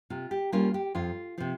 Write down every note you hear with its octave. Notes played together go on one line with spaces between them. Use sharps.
C3 F4
G4
G3 A#3 C#4 F4
G4
F2 F4
C3 F3 F4